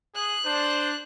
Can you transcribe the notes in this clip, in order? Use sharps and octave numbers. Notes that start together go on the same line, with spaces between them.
G#4 F#6
D4 C5